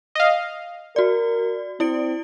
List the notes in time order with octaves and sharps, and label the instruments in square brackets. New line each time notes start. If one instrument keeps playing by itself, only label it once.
[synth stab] D#5 F5
[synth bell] F#4 D5 [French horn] A#4
[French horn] C4 [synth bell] E4 D5 D7